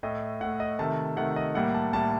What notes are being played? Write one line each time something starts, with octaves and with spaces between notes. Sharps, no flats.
A2 A3 D#5
A2 A3 F#5
D#5
C3 D#3 A3 A5
C3 D#3 A3 F#5
D#5
A2 G3 A#3 F#5
A5
A2 G3 A#3 A5